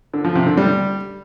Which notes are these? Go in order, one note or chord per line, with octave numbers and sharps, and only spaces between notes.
D3
F3
C3
D3
G3